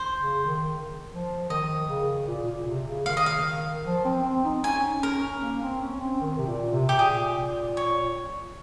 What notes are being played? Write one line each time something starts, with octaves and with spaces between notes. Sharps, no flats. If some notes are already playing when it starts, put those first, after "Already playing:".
Already playing: C5
C#3
D#3
F3
D#3 D#5
C#3
A#2
A#2
C3
C#3
D#3 F5
D#5
F5
F3
C4
C4
D#4
C#4 G#5
C#4 A#4
A#3
C4
C#4
C4
D#3
C3
A#2
C3
G4
A#2 G#4
C#5